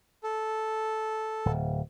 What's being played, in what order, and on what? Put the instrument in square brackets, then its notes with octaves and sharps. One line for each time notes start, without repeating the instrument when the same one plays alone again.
[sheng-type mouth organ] A4
[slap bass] D1